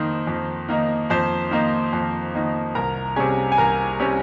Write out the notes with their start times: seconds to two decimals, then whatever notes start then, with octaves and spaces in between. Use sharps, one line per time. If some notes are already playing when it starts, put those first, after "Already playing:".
Already playing: F2 D#3 A#3 D#4 C5
0.27 F2
0.68 D#3 A#3 D#4
1.10 F2 C5 C6
1.51 D#3 A#3 D#4
1.93 F2
2.34 D#3 A#3 D#4
2.75 C2 A#4 A#5
3.16 C3 G3 C#4 G#4 G#5
3.52 G#5
3.58 C2 A#4 A#5
4.00 C3 G3 C#4